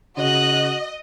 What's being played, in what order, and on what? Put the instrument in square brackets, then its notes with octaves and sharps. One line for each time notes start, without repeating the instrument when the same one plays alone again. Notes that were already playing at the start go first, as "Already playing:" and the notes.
[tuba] C#3 [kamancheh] F#4 F#6 [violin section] D#5